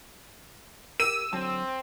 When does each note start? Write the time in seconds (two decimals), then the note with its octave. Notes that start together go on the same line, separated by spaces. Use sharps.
1.00 G4 A#4 E6 D#7
1.33 D3 F#3 C4 A5